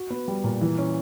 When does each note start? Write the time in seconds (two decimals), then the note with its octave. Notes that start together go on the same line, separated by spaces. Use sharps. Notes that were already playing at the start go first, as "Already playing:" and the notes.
Already playing: F#4
0.10 B3
0.28 G3
0.44 A#2
0.61 E3
0.78 C#4